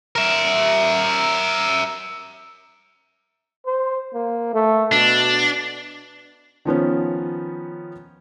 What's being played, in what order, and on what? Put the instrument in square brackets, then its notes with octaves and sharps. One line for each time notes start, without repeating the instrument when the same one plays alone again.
[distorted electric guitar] A#4 E5
[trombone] C5
A#3
A3
[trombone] B2 [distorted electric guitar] D4
[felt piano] D#3 F3 B3 C#4